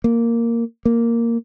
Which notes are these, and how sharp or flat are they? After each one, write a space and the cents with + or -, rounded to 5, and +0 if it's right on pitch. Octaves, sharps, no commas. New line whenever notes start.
A#3 -5
A#3 -5